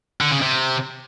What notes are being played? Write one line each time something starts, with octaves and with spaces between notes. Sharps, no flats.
D3
C#3
C3